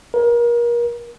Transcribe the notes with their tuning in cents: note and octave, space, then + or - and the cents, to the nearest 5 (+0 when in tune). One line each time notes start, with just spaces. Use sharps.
A#4 +30